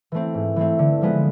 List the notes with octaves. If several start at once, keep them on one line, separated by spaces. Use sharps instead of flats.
E3 A3 C4
G#2
E3 A3 C4
D3
F3 G#3 B3